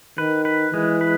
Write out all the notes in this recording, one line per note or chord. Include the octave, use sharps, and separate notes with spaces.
D#3 B4
B4
E3 G#3
B4